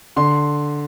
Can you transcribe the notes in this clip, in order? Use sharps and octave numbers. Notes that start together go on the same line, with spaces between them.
D3 C6